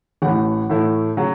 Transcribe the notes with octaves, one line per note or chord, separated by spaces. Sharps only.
A1 A2 E3 F#5
A2 E3 A3 E4
C#3 F#3